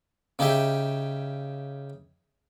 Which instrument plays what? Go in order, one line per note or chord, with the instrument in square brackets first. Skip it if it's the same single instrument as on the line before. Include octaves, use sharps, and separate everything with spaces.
[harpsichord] C#3 D#4 G4 G#4 E5